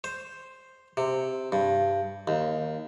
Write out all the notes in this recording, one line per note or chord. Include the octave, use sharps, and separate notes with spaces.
C5
C3
G2
D#2